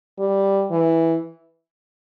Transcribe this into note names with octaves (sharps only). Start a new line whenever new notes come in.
G3
E3